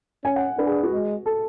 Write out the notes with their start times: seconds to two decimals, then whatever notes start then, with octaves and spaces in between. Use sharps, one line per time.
0.24 C#4 G#5
0.36 F#5
0.58 D4 B4
0.67 G#4
0.83 F#4
0.92 G#3
1.26 A4